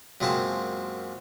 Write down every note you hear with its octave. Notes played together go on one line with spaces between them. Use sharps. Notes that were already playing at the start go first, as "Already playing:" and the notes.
F#2 A#2 G#3 C4 A5